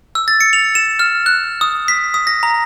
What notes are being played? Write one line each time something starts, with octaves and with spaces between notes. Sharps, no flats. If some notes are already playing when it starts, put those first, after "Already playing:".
E6
A6
C#7
F7
E7
F6
F#6
D#6
B6
D#6
A#6
A#5